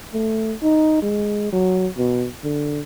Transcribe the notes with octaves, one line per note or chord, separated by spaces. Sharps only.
A3
D#4
G#3
F#3
B2
D3